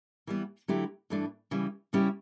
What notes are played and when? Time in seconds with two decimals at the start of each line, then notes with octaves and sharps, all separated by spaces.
0.27 E3 G3 B3
0.68 D3 F#3 A3 E4 G4
1.10 G2 E3 A3 D4
1.51 C#3 E3 G3
1.93 C#3 G3 C#4 E4 G4